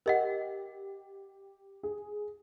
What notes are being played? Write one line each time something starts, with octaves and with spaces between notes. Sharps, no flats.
G4 A#4 D#5 F#5
G#4